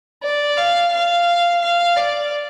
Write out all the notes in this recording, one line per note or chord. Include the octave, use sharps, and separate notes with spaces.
D5
F5
F5
F5
D5